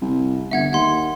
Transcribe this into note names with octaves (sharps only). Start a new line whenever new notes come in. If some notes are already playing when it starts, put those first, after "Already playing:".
C2
G1 E5 F#5 G#6
D#2 F#5 C6